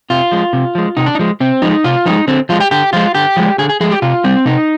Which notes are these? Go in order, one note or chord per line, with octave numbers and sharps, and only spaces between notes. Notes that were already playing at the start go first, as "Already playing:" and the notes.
C3 F4
F3 G#3
C3
F3 G#3
C3 D#4
D4
D#4
F3 G#3
C3 C4
F3 G#3 D#4
C3 F4
F3 G#3 D#4
D3 C4
F3 G#3 F4
G4
D3 G4
F3 G#3 F4
D3 G4
F3 G#3
D3 G#4
G#4
F3 G#3 G#4
G4
C3 F4
G3 C4
C3 D#4